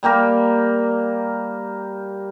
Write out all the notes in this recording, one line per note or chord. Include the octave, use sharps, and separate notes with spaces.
G3 A#3 G4 A#4